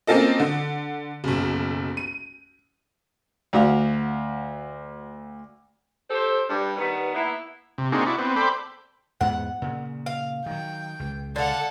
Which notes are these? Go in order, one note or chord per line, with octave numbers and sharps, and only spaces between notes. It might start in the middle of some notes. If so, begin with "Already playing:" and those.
A#3 C4 C#4 F4 A4 D#5
D3
F#1 B1
D#7
D2 F#4 F5
G4 A4 C5
G2
D#3 G3 B3
A#3 B3 E4
C3
A#3 C4 D4 D#4 F#4 G#4
E4 F#4 D5
B3 C4
A4 C5 D5 G5 B5
E2 G#2 B3 F#5
A#2 C#3
F5
D#3 F#3 G5
C#2
D3 A4 F5 F#5